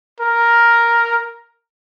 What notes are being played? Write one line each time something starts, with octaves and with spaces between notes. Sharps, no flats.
A#4